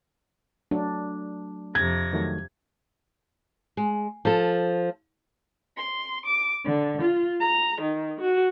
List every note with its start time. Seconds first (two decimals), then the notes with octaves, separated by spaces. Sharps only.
0.71 F#3 A3 D4
1.75 F2 C3 G#6 A#6
2.13 D#3 F#3 A3
3.77 G#3
4.25 F3 A4
5.76 C6
6.24 D6
6.65 D3
7.00 F4
7.40 A#5
7.81 D#3
8.20 F#4